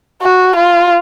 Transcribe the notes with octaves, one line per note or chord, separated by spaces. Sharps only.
F#4
F4